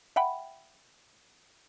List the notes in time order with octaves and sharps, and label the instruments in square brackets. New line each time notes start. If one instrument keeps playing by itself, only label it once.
[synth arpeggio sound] E5 F#5 G5 B5